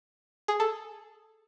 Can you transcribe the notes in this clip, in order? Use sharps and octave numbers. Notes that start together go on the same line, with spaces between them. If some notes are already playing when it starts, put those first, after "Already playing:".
G#4
A4